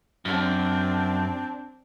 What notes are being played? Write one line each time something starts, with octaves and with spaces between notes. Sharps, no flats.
F#2 C4 D4